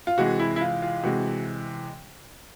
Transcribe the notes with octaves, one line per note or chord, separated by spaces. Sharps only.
F4
C3 E3 G#3 F#4
E4
E4
F4
F4
C3 E3 G#3 F#4